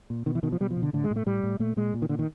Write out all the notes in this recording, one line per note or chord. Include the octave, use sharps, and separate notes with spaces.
A#2
B2 D#3
E3
B2 D#3
F3
B2 G3
F3
B2
D3
A2 D3
G#3
A2
A3
A2 G3
A2
A#2 A3
A#2 G#3
A#2
D#3
A#2 D3
D#3